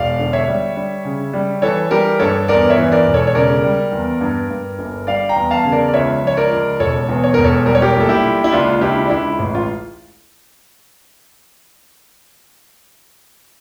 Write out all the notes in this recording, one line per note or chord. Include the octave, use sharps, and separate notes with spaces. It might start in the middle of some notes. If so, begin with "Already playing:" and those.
Already playing: E1 D5 F5
D3
C#5 E5
G3
G3
C#3
G3
E3 A4 C#5
G3 G4 A#4
G2 A4 C#5
E2 A#4 D5
C#5 E5
E3
A#4 D5
E1
A4 C#5
C#5
C#3 A#4 D5
G3
E2
G2
G2
G1
G3 D5 F5
G5 A#5
E2
F5 A5
C#3
A#4 D5
D5
C#2 C#5 E5
F3 C#5
A#4 D5
C#2
E1 A4 C#5
E2
C#5
E1 A#4
A4 C#5
G3 A#4
C#5
G4 A#4
A#1
A4
E4 G4
A#2
E4
C#2 D4 F4
C#2 E4 G4
D4
C#2 E4
A1
F4